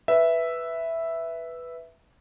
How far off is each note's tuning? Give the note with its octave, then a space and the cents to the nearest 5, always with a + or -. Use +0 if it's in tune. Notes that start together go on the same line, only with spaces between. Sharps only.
B4 +0 E5 +0